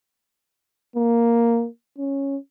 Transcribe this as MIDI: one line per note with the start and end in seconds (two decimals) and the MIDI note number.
0.96 1.67 58
1.98 2.37 61